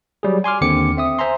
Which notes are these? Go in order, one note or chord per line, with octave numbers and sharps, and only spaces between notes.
F#3 G3 G#4
G#5 C6 D6 F6
D#2 D3 C4 D6 C#7
C4 E5 D#6
C5 E5 G#5 A#5 C6